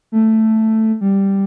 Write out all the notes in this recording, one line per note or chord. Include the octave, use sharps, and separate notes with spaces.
A3
G3